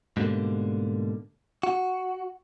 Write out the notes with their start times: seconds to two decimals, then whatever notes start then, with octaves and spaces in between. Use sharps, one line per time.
0.17 G#2 B2 D3 G3 A3 A#3
1.63 F#4